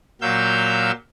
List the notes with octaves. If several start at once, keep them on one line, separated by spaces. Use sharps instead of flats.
A#2 F#3 F5 E6 G6